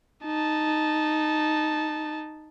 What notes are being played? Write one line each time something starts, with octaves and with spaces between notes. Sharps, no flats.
D#4 A5